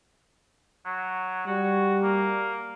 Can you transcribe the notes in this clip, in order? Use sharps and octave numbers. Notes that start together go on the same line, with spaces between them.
F#3
G3 F#4
A#3